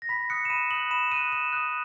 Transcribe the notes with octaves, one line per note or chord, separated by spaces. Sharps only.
A#6
B5 B6
D#6 F#6 C#7
E7
B5 D#7
D#6 F#6 F#7
B5 E7
D#6 F#6 D#7
B5 E7
D#6 F#6